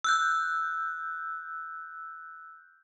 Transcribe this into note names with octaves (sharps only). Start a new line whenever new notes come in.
E6 F#6 G6